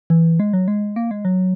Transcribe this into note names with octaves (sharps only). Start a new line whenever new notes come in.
E3
G#3
F#3
G#3
A#3
G#3
F#3